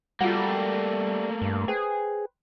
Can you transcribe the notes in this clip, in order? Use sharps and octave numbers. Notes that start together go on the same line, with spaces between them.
G3 A3 A#3 F4 F#4 F#5
G2
G#4 B4 C5 G5